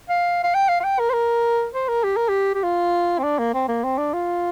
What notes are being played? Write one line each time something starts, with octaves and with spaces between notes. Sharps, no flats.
F5
F5
G5
F5
F5
G5
A#4
C5
A#4
C5
A#4
G4
A#4
G4
G4
F4
C4
D4
A#3
C4
A#3
C4
D4
F4